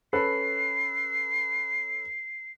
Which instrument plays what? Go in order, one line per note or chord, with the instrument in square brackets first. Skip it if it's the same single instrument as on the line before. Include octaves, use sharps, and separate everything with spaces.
[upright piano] C#4 A4 B4 [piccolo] C7